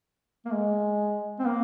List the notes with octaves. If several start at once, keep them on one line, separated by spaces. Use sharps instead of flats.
A#3
G#3
C4
A#3